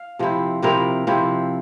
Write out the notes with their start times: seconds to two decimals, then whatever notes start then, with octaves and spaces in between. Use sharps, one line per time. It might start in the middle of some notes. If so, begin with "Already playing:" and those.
Already playing: F5
0.19 C3 F3 C4 E4
0.62 C3 F3 C4 E4 A#4
1.07 C3 F3 C4 E4